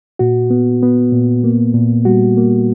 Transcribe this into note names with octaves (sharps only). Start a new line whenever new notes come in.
A#2 F#4
B3
B3
A#2
A#3
A#2
G3 F#4
A#3